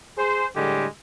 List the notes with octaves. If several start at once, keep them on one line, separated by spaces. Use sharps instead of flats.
G#4 C5
A2 D3 G3 G#3 G4